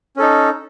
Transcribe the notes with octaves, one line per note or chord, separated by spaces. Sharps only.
C#4 D#4 A4